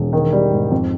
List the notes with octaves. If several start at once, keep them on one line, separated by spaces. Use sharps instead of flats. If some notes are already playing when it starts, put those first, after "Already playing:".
Already playing: E1
D#3
G3
G#2
F2